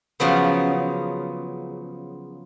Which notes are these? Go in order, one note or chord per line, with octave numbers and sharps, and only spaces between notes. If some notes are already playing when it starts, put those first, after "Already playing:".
C#3 F3 F#3 B3